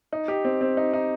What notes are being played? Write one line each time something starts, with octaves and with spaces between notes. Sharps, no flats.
D#4
G4
C4
C4
D#4
D#4